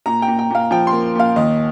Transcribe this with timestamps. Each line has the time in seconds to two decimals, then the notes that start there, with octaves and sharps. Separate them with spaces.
0.06 A#2 A#5
0.22 G5
0.28 A#2
0.39 G5
0.50 A#2 F5
0.71 F3 G5
0.87 C6
0.92 A#3
1.15 A#2 F5
1.36 D#2 D#5